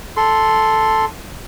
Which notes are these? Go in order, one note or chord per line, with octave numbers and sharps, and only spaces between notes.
A4 C6